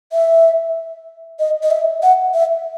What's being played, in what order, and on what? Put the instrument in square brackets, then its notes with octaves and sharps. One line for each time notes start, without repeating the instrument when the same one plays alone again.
[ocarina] E5
D#5
D#5
E5
F#5
E5